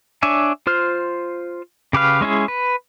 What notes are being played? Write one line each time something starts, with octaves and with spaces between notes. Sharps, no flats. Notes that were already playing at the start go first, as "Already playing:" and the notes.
D4 C#5 E5 G#5
F4 C5 F6
C#3 G4 B4 F5
G#3 C#4 E4 G#4
B4